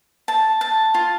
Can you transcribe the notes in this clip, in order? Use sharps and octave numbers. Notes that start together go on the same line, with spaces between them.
A5
A5
F4